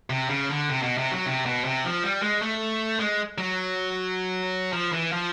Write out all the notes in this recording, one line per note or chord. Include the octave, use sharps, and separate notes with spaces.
C3
C#3
D3
C3
B2
C3
F#3
C3
B2
C3
F3
G3
G#3
A3
G#3
F#3
F3
E3
F3